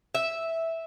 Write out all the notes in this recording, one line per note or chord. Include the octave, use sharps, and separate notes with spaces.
E5